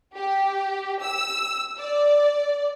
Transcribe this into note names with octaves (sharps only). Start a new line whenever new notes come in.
G4
E6
D5